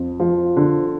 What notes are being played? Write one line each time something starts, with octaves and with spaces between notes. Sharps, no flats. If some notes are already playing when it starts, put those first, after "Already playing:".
Already playing: F2
F3
D3